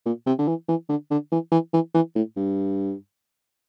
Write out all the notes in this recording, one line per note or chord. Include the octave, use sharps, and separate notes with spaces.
A#2
C3
D3
E3
E3
D3
D3
E3
E3
E3
E3
A2
G2